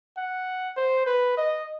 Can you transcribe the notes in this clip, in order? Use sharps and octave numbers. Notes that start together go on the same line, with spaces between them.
F#5
C5
B4
D#5